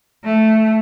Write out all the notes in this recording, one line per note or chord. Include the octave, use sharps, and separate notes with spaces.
A3